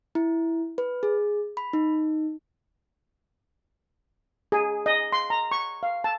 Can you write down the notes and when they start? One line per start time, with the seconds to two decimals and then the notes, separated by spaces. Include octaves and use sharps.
0.15 E4
0.78 B4
1.03 G#4
1.57 B5
1.73 D#4
4.52 G#4
4.86 D#5
5.12 C6
5.30 A#5
5.51 C#6
5.83 F5
6.04 A5